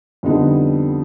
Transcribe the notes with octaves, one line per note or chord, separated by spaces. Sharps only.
F2 D3 G3 B3 D#4